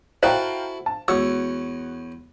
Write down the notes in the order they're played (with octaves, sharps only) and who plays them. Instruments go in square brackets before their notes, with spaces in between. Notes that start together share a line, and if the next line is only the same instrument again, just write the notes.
[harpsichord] E4 F#4 A4 [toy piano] C5 [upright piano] F5 G5 A#5
[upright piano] A5
[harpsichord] E2 C#5 [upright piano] F#4 [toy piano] E6